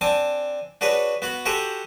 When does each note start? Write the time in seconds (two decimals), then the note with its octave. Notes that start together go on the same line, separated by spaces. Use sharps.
0.01 C4 D4 G#5 A5
0.81 D4 F#4 G#4 B4 C#5
1.22 B3 F#4 F#5
1.46 F#4 G4 A4 C5 F#5 G#5